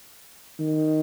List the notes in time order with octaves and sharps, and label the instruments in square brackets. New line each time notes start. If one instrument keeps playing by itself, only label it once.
[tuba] D#3